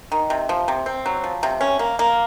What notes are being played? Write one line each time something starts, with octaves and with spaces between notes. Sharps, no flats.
D#3
C3
F3
C3
C4
F#3
F3
C3
C#4
A#3
A#3